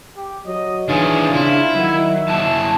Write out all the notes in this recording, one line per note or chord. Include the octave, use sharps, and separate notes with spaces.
G4
F#3 D#5
D#3 E3 D4 F4 G#4 C#5
C#3 E4 F4
D#3 F#3 E5
F#2 E4 A5